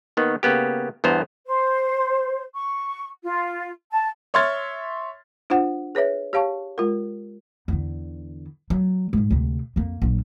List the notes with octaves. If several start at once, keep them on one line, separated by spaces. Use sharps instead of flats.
D#2 D#3 B3
C#3 A#3 B3 G4
E2 G2 B3 C5 A#5
C5
C#6
F4
A5
C#5 E5 C6 F6 G#6 A6
D4 F4 C5 F#5
G#4 B4 C#5 E5
G4 C#5 F5 A5 C#6
G#3 F4 A#4
E2 D3
F#3
G#2 G#3
D2 C3
F2 A#3
A#1 F#3